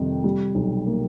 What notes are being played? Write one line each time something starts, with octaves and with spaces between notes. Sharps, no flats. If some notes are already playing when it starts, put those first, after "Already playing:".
Already playing: F2 C3 D#3 G3
G3
B1
A#3